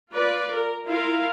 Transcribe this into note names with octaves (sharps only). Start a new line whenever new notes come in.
F4 B4 D5
A#4
E4 F4 A#4 F5